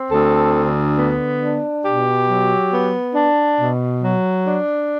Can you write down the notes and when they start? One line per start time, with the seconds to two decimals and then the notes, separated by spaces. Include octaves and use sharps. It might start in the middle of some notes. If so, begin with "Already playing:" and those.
Already playing: C4
0.10 D2 A4
0.54 D3
0.97 B3
1.41 D4
1.84 B2 G4
2.28 F#3
2.71 B3
3.15 D4
3.59 B2
4.03 F#3
4.46 D4